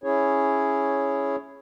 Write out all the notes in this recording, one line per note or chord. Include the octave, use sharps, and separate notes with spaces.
C#4 E4 G#4 C#5